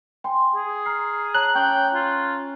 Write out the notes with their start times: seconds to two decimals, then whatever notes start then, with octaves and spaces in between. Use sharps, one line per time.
0.24 G5 G#5 C6
0.56 G#4
0.86 A#5 F6 C7
1.34 C#5 A5 A#5 F#6
1.55 C#4 G5 D6
1.95 F4